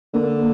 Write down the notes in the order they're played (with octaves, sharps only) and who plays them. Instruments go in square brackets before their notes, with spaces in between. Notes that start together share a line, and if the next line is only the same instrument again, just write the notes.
[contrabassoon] D3 [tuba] A#3